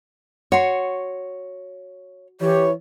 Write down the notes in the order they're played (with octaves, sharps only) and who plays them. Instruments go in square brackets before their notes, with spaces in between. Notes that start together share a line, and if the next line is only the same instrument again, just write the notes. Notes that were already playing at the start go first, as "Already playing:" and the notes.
[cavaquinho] F#4 C6 [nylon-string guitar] C#5
[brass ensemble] E3 C#5 [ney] G4